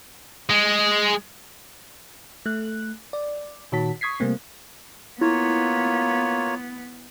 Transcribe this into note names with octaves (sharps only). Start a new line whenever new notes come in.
G#3
A3 F#6
D5
A#2 D#3 F#4 C#5 A5 B6
C#6 D#6 G#6 B6 C7
C3 G3 A3 A#3 C4
A#3 B3 E4 F4 C#5